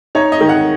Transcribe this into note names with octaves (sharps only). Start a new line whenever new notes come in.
D#4 C#5
D#5
D#3
F#5